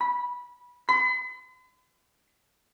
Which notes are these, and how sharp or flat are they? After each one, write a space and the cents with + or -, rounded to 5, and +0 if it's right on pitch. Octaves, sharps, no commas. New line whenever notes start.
B5 -20
B5 +45